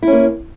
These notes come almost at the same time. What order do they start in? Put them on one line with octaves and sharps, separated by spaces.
E4 C#4 A#3